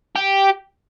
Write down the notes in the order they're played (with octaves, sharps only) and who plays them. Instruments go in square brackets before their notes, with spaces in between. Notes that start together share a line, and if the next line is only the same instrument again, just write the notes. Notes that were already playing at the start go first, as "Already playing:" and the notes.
[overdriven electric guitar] G4